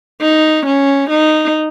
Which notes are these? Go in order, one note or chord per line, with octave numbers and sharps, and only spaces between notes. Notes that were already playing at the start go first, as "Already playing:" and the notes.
D#4
C#4
D#4